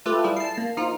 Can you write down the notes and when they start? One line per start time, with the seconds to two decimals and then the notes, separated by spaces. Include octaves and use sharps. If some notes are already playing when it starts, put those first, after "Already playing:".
0.06 A3 F4 G4 A4 B4
0.24 G3 E4 G#4
0.37 A5 C7
0.58 A#3
0.77 F3 D#4 F4